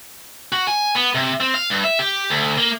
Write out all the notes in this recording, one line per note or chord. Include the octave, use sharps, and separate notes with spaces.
F#4
G#5
B3
C3
C4
F5
G2
E5
G4
D2
A#3